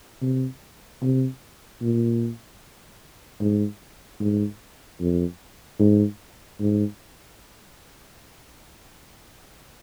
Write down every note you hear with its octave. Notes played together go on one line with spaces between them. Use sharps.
C3
C3
A#2
G#2
G#2
F2
G#2
G#2